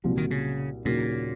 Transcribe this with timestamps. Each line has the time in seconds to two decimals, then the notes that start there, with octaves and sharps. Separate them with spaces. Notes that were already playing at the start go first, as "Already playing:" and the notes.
0.04 C2 A#2 F3 F#3
0.17 D#3
0.31 C#3
0.85 D#2 A#2 C#3 F#3 A#3